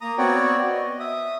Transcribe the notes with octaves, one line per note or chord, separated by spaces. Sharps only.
A#3 A#5 D#6
B3 C4 F#4 C#5 D5 G5
D#5
E5 D#6